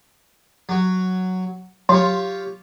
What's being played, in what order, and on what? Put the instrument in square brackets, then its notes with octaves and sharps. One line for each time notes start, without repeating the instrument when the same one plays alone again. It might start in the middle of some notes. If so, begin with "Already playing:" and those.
[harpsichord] F#3 F#4
[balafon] F#3 [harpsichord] F4 G4 C#5